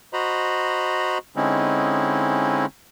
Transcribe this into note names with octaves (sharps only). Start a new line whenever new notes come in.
F#4 C5 D#5 A#5 B5
D3 G#3 C4 C#4 D#4 E4